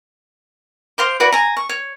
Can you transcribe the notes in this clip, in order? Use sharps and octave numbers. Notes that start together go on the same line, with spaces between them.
C5 F5 C6 D6
E4 F#4 B4 D5
G#5 A#5
C#6
C#5